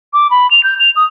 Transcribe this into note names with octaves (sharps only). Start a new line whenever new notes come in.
D6
B5
F7
G6
F7
D#6